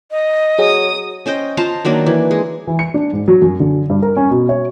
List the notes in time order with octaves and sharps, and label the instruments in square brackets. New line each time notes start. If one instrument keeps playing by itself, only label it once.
[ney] D#5
[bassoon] F#3 [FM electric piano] G#4 [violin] D#6
[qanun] C#4 C5 D#5 G5
F4 C5 A5 A#5
D#3 F#3 A#3 D4
E3
G#3
[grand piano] E3
C#7
D4
G#2
F#3
F#2
D3
G2
A#4
C#4
B2
C#5